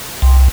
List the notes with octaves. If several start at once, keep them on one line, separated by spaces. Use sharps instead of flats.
C2